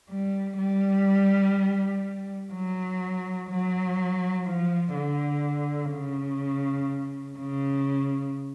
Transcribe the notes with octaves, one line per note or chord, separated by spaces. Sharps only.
G3
G3
F#3
F#3
F3
D3
C#3
C#3